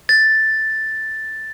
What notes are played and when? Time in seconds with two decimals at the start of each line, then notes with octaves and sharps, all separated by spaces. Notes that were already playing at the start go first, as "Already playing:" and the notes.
0.09 A6